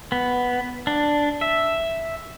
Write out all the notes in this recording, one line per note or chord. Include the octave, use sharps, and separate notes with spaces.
B3
D4
E5